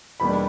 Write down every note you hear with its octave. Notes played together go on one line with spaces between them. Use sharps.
E2 B2 G3 A#3 D4 B5